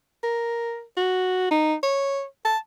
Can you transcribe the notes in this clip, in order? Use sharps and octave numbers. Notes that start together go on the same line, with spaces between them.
A#4
F#4
D#4
C#5
A5